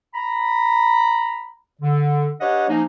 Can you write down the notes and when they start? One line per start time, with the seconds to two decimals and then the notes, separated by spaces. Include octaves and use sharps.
0.14 A#5 B5
1.82 D3
2.41 D4 G4 B4 C#5 D#5 F#5
2.69 F3 A#3 C#4 D#4